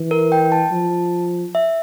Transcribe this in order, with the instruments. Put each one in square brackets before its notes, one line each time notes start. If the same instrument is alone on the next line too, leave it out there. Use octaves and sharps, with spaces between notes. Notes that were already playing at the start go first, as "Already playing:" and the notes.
Already playing: [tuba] E3
[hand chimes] A#4
G5
A5
[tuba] F3
[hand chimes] E5